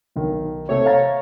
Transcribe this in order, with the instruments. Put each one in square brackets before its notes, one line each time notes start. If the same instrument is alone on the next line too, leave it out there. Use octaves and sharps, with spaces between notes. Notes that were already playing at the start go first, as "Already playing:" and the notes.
[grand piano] B1 D#3
[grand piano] C3 A3 [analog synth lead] C#5
[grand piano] F5 A#5 A6